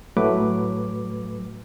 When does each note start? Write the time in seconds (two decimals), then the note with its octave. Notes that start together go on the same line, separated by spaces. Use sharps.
0.17 A2 F#3 A3 B4 D6